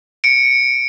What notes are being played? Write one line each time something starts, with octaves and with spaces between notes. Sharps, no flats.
C#7 D7